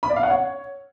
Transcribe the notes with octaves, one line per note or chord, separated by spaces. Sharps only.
B5
D5
F5
F#5
C#5